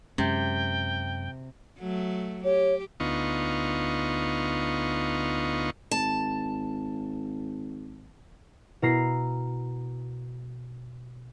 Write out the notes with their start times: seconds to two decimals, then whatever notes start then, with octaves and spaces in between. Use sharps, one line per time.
0.18 F#2 C3 G#3 C#4 G5
1.79 F#3 A3
2.44 G4 C#5
3.00 D2 B3 D#4 F4 C#6
5.91 G#1 A5
8.82 B2 E4 A#4 A#5 C7